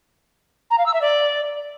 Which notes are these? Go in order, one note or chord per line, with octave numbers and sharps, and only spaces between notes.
A#5
F5
E6
E5
D5